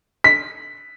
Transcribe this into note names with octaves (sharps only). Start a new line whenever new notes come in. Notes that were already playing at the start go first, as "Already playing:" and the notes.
B6